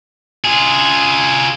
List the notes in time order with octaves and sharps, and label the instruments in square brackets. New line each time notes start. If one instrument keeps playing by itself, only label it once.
[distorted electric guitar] F4 G#4